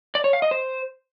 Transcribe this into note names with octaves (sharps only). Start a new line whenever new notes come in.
D5
C#5
F5
D#5
C5